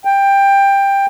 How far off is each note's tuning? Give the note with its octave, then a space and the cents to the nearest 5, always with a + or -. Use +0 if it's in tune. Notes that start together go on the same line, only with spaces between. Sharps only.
G5 +15